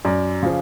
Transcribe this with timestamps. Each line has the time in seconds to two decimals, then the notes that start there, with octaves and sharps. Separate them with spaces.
0.05 F#2 D5
0.43 C#3 F3